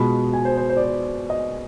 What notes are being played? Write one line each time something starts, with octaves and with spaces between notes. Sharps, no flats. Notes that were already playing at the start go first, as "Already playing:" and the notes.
Already playing: B2 G#3 B3 F4 B5
G#5
C5
C5
C5
D5
C5
D#5